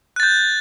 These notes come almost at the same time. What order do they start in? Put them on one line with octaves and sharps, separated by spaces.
F#6 A6 G6